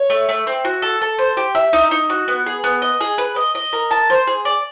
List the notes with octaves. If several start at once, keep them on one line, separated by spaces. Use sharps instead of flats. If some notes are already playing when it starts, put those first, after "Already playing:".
Already playing: C#5
A3
A3
C4
F#4
A4
A4
C5
G4
E5
D#4
D#4
F#4
B3
G#4
B3
D#5
G#4
B4
D#5
D#5
A#4
A5
C5
G#4
D5